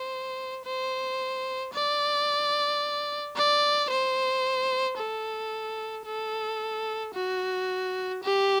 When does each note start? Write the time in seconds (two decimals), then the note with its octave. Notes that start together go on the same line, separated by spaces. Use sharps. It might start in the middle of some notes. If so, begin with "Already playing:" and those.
Already playing: C5
0.65 C5
1.73 D5
3.36 D5
3.90 C5
4.97 A4
6.06 A4
7.14 F#4
8.23 G4